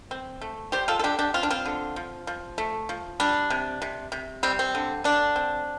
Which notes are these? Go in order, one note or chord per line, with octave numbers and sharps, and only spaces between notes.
C4
A3
G3 G4 C5
F4 A4
A4
D3 D4 G4
D4 G4
C4 F4
D4
C4 F4
D3
F3
F3
A3
F3
G3 D4
C3
C3
C3
G3 C4
C4
D3
D3 D4
C4